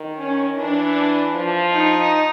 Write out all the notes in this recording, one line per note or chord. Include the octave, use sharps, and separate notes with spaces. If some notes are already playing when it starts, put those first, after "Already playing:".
Already playing: D#3
C#4
E3 D4
F3
D#4